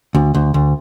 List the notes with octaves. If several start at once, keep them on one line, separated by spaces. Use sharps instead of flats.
D2
D2
D2